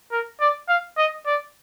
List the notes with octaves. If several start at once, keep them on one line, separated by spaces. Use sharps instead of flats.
A#4
D5
F5
D#5
D5